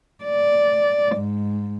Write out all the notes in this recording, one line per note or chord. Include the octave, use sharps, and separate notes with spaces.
D5
G#2